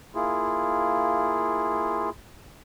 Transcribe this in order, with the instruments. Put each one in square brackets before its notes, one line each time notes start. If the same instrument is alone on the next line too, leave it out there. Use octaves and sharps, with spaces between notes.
[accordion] A#3 E4 F4 G#4